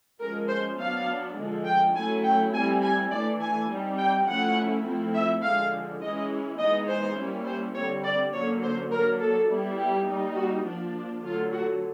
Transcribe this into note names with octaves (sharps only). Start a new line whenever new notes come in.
F3 G#3 C#4 A#4
C5
F#3 B3 D4 F5
D3 F3 G#3
G5
F#3 A3 C#4 E4 G#5
G5
G3 C4 E4 G#5
G#5
E3 A3 D4 D5
G#5
G3 C4 D#4
G5
F3 A3 C#4 E4 F#5
F3 A3 C4 E4
E5
D3 F3 G#3 F5
E3 G#3 C#4 E4 D#5
E3 G#3 B3 D#4 D#5
C5
G3 A#3 C#4 E4
C5
D3 G3 C4 C#5
D5
D3 F#3 A#3 C#4 C#5
C5
F#3 A#3 D4 A#4
A4
G3 B3 E4
G4
G3 A#3 D#4
F#4
F3 A#3 D4
D3 F#3 A3 F4
F#4